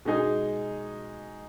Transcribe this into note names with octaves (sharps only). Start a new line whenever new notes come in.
B2 G#3 D#4 G#4